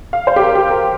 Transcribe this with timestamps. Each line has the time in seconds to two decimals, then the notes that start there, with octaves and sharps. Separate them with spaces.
0.13 F5
0.27 C5
0.36 G4
0.42 A#4
0.55 G4
0.70 A#4